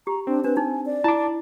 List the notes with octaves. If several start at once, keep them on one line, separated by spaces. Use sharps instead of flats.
G4 A#5
C4 D4
D4 B4
D#4 G#5
D5
E4 A5 D6